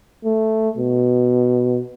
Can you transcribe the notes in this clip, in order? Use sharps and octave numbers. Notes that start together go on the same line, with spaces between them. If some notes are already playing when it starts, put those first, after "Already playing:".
A3
B2